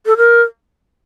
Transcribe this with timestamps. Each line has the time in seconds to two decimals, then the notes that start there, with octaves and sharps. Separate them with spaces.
0.06 A4
0.17 A#4